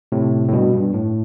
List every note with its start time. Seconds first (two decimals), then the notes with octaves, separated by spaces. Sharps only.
0.12 A2 C3
0.48 A2
0.52 G2 B2
0.73 G2
0.94 A2